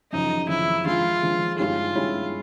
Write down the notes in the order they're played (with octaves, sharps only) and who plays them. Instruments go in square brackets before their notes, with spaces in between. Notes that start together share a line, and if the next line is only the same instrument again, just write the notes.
[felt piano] F#2 C#3 F3 [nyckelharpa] D#4
[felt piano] F#2 C#3 F3 [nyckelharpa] E4
[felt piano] D3 F3 G#3 [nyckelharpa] F4
[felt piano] D3 F3 G#3
[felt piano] G2 D#3 G#3 C#4 E4 [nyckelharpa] F4
[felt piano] G2 D#3 G#3 C#4 E4